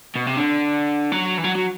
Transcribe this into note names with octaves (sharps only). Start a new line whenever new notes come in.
B2
C3
D3
F#3
E3
F#3
F#3